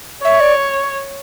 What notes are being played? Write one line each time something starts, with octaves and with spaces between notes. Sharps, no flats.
C#5 E5
D5